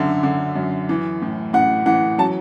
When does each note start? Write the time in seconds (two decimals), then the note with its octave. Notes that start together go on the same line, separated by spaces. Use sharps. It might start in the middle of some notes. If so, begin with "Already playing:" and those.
Already playing: F#2 D3 E5
0.23 D3
0.56 F#2
0.89 E3
1.22 A2
1.53 A2 F#5
1.86 E3 F#5
2.18 F#3 A5